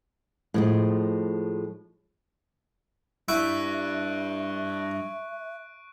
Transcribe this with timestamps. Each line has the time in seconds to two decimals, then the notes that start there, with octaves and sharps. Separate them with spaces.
0.54 A2 F3 G#3
3.29 G3 D4 E4 E5 C#6 F#6 D7